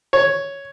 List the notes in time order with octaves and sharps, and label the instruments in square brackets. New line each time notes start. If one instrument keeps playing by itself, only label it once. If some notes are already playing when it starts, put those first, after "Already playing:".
[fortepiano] C#5